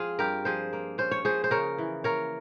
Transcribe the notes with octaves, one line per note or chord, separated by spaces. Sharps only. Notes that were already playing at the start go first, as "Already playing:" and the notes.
Already playing: F3 C4 F4 G#4
G2 G4 A#4
F3 G#4 C5
A#3
C#4 C5
C#5
F3 G#4 C5
C5
C#3 A#4 C#5
E3
A#3 A#4 C#5